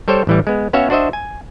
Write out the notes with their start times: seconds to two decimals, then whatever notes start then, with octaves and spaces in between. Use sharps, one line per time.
0.08 G3 A4 C5 C#5 G5
0.27 A1 E3 G3
0.47 G#3 B3
0.73 B3 C#4 F#4 C#5 E5 F5
0.90 D4 F#4 C5 D#5 E5
1.13 G#5